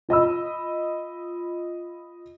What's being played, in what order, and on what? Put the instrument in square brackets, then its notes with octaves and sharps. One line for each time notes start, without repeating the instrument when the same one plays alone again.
[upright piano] F4 D#5 B5 E6